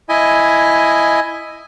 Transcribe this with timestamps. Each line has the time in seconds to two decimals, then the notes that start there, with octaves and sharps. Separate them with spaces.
0.09 E4 D#5 G#5